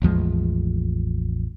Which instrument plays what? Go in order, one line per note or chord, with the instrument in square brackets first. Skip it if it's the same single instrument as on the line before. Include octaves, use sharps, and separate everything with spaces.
[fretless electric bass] A1 E2 F3 G#3